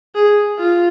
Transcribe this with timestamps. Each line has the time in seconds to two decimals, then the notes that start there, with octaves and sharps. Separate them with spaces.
0.15 G#4
0.59 F4